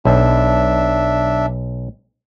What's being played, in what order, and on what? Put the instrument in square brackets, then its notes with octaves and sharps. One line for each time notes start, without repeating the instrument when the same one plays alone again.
[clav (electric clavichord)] B1 [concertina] D4 E5